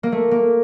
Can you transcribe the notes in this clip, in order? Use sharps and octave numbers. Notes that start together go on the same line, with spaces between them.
A#3
A3
A#3